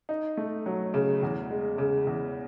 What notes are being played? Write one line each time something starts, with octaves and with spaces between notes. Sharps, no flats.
D#4
A3
F#3
C#3
E2
G#3
C#3
E2